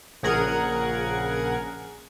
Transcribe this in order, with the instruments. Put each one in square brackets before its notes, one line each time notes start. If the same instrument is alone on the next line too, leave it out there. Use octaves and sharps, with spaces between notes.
[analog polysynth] A#1 C#3 G#4 A#4 F#5 G#6